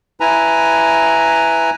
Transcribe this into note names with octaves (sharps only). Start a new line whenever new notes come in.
E4 B4 G#5 A#5